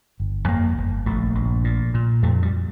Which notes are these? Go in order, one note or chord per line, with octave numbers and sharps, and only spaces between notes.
G1
F2 A#3
G1
A#1 A3
A#1
A#2
A#2
F2 A3
G3